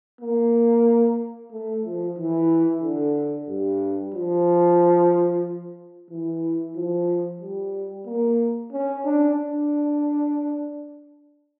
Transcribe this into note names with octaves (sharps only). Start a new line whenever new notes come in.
A#3
A3
F3
E3
D3
G2
F3
E3
F3
G3
A#3
C#4
D4
D4